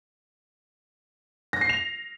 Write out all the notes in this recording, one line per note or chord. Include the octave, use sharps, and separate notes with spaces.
A#6
C7
F7